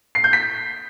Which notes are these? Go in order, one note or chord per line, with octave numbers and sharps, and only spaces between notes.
C7
G6
B6